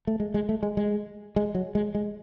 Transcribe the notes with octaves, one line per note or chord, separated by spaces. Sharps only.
A3
G#3
G#3
A3
G#3
G#3
G#3
F#3
G#3
G#3